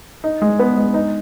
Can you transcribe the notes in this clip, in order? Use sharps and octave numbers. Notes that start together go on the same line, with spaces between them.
D#4
G#3
B3
G#3
D#4